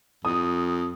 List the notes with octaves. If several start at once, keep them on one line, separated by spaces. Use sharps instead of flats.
F2 D#6